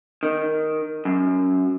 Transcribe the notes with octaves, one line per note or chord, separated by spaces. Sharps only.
D#3
F#2